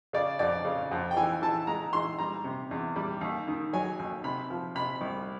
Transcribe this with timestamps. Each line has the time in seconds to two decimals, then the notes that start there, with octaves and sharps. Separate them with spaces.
0.13 C#3 D5
0.39 F2 D5
0.65 C#3
0.91 F2
1.11 G5
1.17 E3 G#5
1.42 E3 A5
1.67 G#3 A#5
1.93 E3 C6
2.18 G3 A#5
2.44 C3
2.71 E2
2.96 G3
3.21 D#2
3.47 D#3
3.73 F#3 G#5
3.99 D#2
4.24 C3 B5
4.50 F3
4.75 C3 B5
5.01 C2